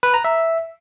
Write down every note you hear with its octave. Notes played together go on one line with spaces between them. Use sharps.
B4
A#5
E5